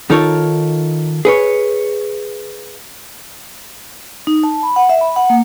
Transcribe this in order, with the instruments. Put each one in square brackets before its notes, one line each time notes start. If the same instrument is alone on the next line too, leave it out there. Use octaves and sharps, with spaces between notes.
[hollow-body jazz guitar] D#3 D#4 F4 A4 A#4 C#5
G#4 B4 C#5
[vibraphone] D#4
A5
B5
F#5
E5
B5
F#5
A#3